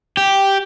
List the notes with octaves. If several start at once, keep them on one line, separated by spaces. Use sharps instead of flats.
G4